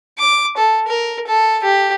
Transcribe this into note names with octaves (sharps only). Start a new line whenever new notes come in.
D6
A4
A#4
A4
G4